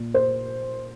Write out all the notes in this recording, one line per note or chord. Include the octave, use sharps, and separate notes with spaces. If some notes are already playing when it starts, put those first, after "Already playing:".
Already playing: A#2
C5